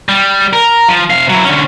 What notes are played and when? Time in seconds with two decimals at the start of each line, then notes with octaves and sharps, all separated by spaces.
0.09 G3
0.53 A#4
0.88 F3
1.10 C3 F5
1.29 F#3 E4
1.44 D3 C#4